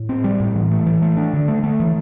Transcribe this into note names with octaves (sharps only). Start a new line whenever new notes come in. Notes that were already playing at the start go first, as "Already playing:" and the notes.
Already playing: A2
C4
G3
A2
E3
A3
E3
A3
D4
D3
A3
A3
E3